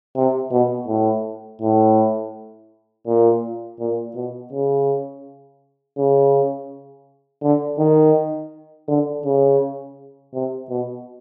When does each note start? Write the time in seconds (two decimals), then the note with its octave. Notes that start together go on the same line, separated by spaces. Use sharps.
0.16 C3
0.52 B2
0.88 A2
1.62 A2
3.07 A#2
3.80 A#2
4.15 B2
4.53 C#3
5.98 C#3
7.42 D3
7.79 D#3
8.88 D3
9.25 C#3
10.34 C3
10.70 B2